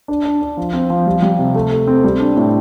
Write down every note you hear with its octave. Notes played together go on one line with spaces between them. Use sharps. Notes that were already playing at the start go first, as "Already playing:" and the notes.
D4
D4
D4
F3
C4
F3
G3
G3
C3
A3
A3
C4
G3
D4
A2